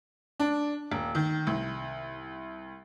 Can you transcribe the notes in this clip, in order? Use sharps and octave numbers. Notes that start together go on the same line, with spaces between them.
D4
D#1
D#3
C2